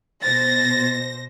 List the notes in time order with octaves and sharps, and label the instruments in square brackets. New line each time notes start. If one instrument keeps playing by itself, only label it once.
[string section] B2 C5 A#6 [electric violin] A6